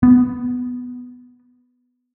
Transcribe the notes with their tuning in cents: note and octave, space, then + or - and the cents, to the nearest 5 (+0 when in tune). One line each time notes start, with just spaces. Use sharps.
B3 +5